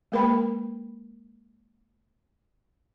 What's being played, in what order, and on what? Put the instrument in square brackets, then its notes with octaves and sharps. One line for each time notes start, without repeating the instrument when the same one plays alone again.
[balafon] G#3 A#3 A#4 B4 G5 B5